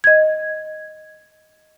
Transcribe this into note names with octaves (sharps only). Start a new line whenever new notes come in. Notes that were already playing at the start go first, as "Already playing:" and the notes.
D#5 G#6